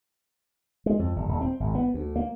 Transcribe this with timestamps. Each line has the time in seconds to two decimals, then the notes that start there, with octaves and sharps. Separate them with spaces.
0.86 G#3
0.99 F2
1.16 G1
1.29 D#1
1.41 C4
1.60 G#1
1.75 B3
1.94 D2
2.16 A#3